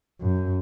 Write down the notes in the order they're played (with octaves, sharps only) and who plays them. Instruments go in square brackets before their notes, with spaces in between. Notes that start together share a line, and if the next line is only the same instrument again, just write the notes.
[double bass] F#2